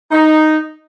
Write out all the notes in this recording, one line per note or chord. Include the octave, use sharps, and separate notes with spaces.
D#4